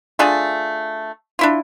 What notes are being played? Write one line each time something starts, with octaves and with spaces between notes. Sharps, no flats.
A3 D4 F4 G#4
D4 E4 F4